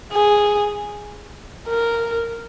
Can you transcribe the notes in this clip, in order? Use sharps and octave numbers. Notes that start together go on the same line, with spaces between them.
G#4
A#4